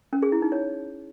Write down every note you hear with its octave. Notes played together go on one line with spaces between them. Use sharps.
C#4
G#4
E4
D#4
C#5